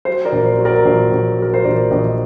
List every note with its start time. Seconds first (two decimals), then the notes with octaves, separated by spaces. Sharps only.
0.05 F#3 C5
0.25 A#4 D5
0.32 A#1
0.45 C5
0.59 F#3
0.65 A#4 D5
0.85 A#1 C5
1.12 A#1
1.38 F#3 A#4
1.54 C5
1.64 A#1 A#4 D5
1.91 A#1 C5 D#5